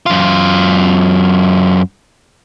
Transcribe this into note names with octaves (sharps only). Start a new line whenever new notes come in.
F#2 F4